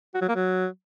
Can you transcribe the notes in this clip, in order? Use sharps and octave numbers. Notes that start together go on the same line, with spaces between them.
F#4
F#3
A#3
F#3